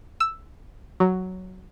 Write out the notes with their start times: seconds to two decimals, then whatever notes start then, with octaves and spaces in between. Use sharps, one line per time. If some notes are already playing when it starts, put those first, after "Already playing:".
0.20 E6
1.00 F#3